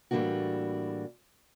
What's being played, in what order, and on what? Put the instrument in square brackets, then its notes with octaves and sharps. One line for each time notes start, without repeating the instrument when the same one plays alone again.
[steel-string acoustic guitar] A2 E3 G3 A#3 D4 F#4